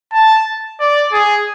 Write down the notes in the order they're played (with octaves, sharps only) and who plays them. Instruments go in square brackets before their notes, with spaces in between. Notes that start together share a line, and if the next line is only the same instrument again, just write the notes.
[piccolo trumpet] A5
D5
G#4